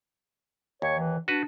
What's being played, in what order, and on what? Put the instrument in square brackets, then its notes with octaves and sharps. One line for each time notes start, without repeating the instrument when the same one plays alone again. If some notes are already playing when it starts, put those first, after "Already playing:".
[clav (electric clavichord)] D#2 [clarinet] C#5
[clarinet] E3
[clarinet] D4 [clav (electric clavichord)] F#4 B4